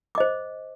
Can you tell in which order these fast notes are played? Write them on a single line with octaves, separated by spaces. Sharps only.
D6 D#5 C5